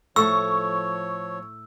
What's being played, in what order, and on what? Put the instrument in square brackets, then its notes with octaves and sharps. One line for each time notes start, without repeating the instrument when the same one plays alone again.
[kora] A2 A4 [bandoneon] F3 C#5 [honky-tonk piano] C#6 [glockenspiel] E6